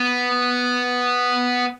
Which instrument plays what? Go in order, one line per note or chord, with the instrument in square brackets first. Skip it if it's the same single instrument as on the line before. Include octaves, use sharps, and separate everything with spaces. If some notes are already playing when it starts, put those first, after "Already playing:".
Already playing: [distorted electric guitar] B3